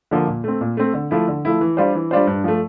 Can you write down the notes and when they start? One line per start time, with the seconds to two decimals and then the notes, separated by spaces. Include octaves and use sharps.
0.11 D3 F3 A#3
0.27 A#2
0.44 A3 C4
0.61 A#2
0.77 A3 C4
0.94 D3
1.11 F3 A3 E4
1.28 D3
1.45 F3 A3 E4
1.61 E3
1.77 G3 D4 F4 C5
1.95 E3
2.11 G3 D4 F4 C5
2.27 G2
2.44 F3 A3